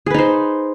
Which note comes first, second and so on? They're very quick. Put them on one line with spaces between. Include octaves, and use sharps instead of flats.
G#4 B4 D#4 C5